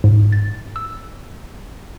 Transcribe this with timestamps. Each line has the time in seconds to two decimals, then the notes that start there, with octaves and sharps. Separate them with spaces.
0.04 G#2
0.32 A6
0.76 E6